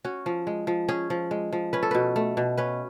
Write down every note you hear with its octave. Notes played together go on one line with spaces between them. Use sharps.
C#4 F#4
F3
G#3
F3
C#4 G#4
F3
G#3
F3
C#4 B4
A4
B2 B4
A3
B2
C#4 B4